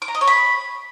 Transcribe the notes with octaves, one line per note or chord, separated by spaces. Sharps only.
D6
A#5
D#5
C#5
B5